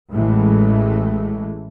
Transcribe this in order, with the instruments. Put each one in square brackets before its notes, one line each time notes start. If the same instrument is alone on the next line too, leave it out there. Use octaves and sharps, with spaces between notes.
[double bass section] A1 A2 E3 G#3 A3